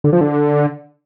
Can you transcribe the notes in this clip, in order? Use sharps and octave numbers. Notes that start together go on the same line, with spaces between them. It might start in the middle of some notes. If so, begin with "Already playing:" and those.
D3
F3
D3